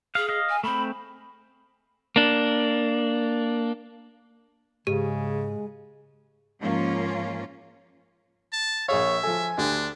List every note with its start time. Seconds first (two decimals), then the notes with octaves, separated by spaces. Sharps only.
0.15 G#4 F5
0.29 D#5 F5
0.49 G#5
0.64 A3 C4 B5
2.16 A#3 D4
4.87 G#2 C#3 G#3 G4
6.59 G#2 F3 A#3 C#4 F4
8.52 A5
8.88 A#1 G#4 C#5 E5 F5
9.24 F3 A4 G#5
9.58 D2 D3 D4 G4